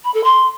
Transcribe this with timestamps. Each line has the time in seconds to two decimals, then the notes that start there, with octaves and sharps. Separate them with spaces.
0.04 B5
0.13 A4
0.23 C6